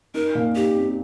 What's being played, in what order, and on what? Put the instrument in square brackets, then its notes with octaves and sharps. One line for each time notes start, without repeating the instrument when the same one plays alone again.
[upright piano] D#4 [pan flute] A#4
[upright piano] A#2
[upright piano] D#4 [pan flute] G4
[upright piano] C4